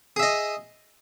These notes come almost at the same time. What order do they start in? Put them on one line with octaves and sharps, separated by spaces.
G#4 E5 D#5